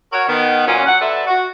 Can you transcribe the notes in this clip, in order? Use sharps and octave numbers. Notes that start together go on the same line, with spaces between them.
F#4 A#4 C#5
D#3 B3
A#2 F#3 C#4
F#3 F#5
F#3 A4 B4 C5 D5 E5
F#4